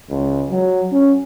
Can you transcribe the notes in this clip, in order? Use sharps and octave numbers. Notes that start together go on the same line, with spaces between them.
C#2
F#3
C#4